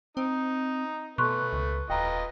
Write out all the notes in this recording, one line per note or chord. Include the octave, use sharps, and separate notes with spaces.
C4 D#4
B2 A3 B4 C6 C#6 F#6
C#2
D#1 F4 B4 D#5 G5 A#5